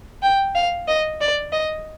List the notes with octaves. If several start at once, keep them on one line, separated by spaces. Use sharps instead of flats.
G5
F5
D#5
D5
D#5